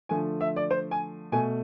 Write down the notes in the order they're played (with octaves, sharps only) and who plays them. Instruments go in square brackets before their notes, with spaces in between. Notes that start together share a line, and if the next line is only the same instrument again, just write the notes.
[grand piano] D3 F3 A3 G#5
E5
D5
C5
G#5
B2 A3 G#5